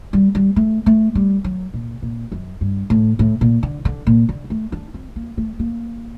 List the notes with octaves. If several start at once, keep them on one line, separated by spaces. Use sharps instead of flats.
G3
G3
A3
A3
G3
F#3
A#2
A#2
F#2
G2
A2
A2
A#2
D3
D3
A#2
D3
A3
D4
C4
A#3
A3
A#3